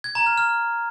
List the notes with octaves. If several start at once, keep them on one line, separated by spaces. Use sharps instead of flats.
G#6
A#5
F6
F6